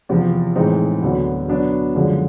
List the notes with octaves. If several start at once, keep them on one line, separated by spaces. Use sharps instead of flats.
E2 C3 F3
A2 E3 G#3 C4 D#4
D2 D3 F#3 B3
B2 F#3 B3 D4
F#2 D3 F3 G#3